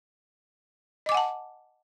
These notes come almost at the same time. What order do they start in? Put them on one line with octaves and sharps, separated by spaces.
D#5 D6 G#5 F#5 A5